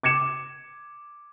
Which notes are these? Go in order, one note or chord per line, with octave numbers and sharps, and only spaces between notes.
D6 G#6 C#7 E7